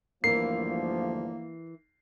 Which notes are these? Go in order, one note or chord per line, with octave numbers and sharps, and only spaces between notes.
G1 D2 E3 F3 A#3 A#4 C7